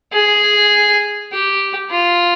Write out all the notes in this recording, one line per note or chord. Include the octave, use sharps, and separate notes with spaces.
G#4
G4
F4